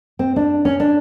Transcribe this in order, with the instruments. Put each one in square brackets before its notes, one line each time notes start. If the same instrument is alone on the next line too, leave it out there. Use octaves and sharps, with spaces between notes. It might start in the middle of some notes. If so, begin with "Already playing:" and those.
[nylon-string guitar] C4
D4
C#4
D4